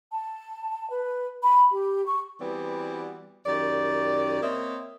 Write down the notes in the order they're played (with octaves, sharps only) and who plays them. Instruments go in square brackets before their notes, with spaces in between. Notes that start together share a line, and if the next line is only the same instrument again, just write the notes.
[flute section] A5
B4
B5
G4
C#6
[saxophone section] E3 G3 B3 C4 F#4 D5
F#2 D#3 G4 D5
A#3 C4 C#5 D#5 E5